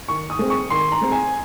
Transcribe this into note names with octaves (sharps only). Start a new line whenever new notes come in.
D#3 C#6
D#6
G#3 C4
C#6
D#3 C6
A#5
G#3 C4
G#5